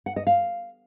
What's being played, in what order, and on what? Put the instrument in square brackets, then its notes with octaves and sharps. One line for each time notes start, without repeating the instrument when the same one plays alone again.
[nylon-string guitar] F#5
D#5
F5